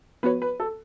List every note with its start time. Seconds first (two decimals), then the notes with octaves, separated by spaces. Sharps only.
0.23 F3 B3 F#4 B4 C#5
0.42 B4
0.60 A4